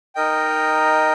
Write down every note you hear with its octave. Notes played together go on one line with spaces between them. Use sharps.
D#4 A#4 D#5 G5